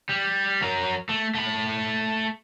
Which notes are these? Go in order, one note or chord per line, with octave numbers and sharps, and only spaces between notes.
G3
F#3 A#4
A3
A3 B5